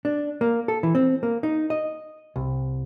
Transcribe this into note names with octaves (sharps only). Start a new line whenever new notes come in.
D4
A#3
A4
E3
C4
A#3
D#4
D#5
C2